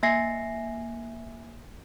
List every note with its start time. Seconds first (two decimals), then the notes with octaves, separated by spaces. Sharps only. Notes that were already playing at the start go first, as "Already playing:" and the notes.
0.03 A#3 E5 G#5 A#6 C7